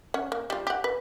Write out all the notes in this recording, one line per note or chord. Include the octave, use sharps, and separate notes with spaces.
C#4 C#5 F#5
A#3
G3 F4
G4 F#5
B4